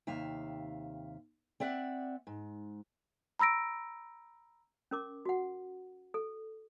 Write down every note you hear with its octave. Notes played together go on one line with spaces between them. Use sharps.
D#2 C3 E5 F5
C4 D5 E5 F#5
G#2
A#5 B5 E6 A#6 D7
C#4 A#4 D6
F#4 F#5
A4